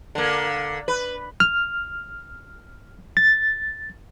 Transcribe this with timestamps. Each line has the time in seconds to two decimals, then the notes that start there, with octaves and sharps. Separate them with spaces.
0.15 D3 A#3
0.88 B4
1.40 F6
3.17 A6